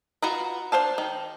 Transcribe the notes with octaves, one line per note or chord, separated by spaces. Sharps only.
F4 F#4 B4 A#5
D4 C5 F5 A5
D#3